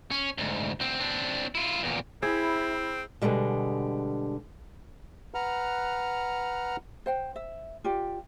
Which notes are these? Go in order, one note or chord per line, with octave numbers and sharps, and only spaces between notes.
C#4
D2 G#2
D2 C4
C4 D4
E4 F4
E2 A#2
C4 E4 G#4
B2 D3 D#3 G3 G#3
B4 F#5 A#5 F6
C5 F#5 G5
E5
F4 G4 D5